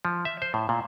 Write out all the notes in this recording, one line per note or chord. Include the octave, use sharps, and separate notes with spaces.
F3
E5
C5
A2
A#2